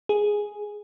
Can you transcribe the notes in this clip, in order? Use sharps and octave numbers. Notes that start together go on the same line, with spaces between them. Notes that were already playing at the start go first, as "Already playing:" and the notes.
G#4